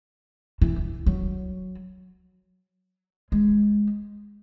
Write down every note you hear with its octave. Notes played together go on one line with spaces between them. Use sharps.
E3
F#3
G#3